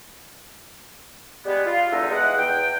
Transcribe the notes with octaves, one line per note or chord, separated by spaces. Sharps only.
G3 G#3 B3
F4
E2 D3 E3 G3 D#4 E5
G#3 B3 E5 F#5
E2 G5